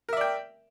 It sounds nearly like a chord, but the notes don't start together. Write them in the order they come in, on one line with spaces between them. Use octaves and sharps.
A#4 E5 D5 G5